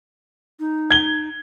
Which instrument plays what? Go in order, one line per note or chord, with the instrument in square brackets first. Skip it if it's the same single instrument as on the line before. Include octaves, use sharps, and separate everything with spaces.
[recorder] D#4
[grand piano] G#6 G7